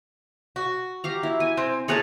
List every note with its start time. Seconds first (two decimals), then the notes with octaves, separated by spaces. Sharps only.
0.56 F#4
1.04 G4 F5 A#5
1.23 E4
1.40 G#5
1.57 C4
1.88 A3 G#4 A#4 C#5 F#5 A5